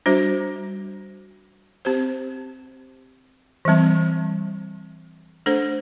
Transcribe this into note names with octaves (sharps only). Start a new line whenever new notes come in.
G3 D4 F#4 C5
C4 G4 C5
E3 G3 C4
A3 D4 A4 C5